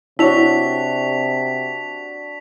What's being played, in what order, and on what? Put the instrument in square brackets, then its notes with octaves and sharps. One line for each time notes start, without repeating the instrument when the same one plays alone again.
[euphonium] C3 [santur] D4 F#4 [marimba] E4 C#5 [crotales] B6 F7